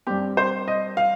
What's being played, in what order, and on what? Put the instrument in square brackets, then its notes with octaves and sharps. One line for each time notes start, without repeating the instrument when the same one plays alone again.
[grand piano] G2 G3 C4 G4
C5
D#5
F5